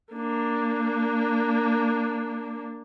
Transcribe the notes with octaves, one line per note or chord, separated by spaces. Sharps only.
A#3 D4